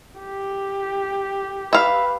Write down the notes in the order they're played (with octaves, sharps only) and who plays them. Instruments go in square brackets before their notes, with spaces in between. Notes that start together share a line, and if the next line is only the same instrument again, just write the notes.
[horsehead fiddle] G4
[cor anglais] B4 [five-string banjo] E5 F5